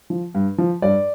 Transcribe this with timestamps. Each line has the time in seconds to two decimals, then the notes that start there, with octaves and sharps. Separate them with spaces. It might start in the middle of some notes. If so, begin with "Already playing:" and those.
0.10 F3
0.34 G2
0.58 F3
0.82 G2 D5